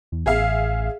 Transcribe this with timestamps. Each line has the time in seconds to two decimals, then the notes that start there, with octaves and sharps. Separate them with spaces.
0.12 E2
0.26 A1 G#4 E5 F5